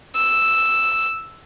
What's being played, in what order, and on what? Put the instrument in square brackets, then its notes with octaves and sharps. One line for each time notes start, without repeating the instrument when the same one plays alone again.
[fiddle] E6